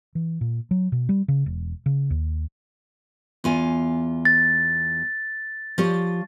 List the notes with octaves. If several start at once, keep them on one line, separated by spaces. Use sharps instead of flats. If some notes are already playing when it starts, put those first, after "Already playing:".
E3
A#2
F#3
B2
G3
C#3
E1
C#3
D#2
E2 F4 G#5
A6
F3 G4 C#5